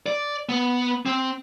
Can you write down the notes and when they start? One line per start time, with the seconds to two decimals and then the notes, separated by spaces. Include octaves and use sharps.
0.06 D5
0.49 B3
1.06 C4